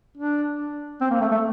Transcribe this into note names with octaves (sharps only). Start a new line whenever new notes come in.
D4
C4
A#3
A3
A3